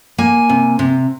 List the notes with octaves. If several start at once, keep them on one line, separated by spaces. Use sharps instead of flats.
A#3 G#5
C3
C3